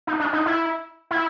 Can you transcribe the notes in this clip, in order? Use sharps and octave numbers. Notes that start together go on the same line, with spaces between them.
D#4
D4
D#4
E4
E4